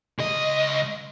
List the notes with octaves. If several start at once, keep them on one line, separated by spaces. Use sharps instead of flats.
C#2 D#5